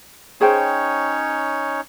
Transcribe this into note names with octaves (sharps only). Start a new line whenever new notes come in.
C#4 D#4 G#4 C5 C#5 G5